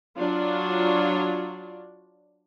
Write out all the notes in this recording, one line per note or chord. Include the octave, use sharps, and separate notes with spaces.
F#3 D4 F4